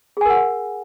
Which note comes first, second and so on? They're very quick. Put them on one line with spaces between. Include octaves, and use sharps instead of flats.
G#4 G#5 A#4 F#5